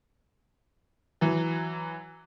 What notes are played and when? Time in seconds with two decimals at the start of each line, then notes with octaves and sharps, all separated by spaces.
1.21 E3 F#3